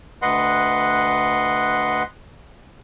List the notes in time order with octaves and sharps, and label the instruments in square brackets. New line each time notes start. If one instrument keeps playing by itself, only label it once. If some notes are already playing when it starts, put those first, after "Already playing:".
[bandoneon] D2 B4 D#5 F#5 C6